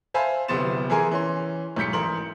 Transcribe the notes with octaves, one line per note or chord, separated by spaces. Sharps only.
C5 E5 F5 G#5 A5 B5
D1 C3 B3 C6 A6 E7
E3 E4 G#4 A#4 G#5 C6
E3 C#4 C6
B1 G#2 G6 B6 C#7
A1 A#4 C6 F#7